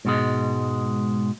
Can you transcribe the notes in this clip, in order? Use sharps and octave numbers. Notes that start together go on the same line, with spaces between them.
G#2 B2 G#3